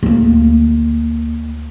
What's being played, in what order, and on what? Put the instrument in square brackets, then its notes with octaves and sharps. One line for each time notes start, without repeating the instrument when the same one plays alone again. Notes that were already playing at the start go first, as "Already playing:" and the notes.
[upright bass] D2 A#3